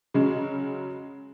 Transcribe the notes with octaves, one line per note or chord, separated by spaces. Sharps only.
C#3 F#3 G#3 C#4